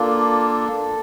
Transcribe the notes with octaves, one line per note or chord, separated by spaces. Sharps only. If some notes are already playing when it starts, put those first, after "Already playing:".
Already playing: A#3 D4 F4 A4